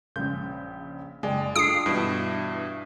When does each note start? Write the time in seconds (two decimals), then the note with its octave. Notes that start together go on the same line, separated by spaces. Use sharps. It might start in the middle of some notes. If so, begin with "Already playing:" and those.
0.16 A#1 C#3 G6
1.23 F#1 G#3 D5 G5 G#5
1.56 G#3 D4 F4 A4 D#6 C7 D7
1.86 G2 B2 E3 D4 E5